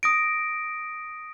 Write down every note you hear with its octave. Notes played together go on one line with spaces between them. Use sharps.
D#6 A#6 D7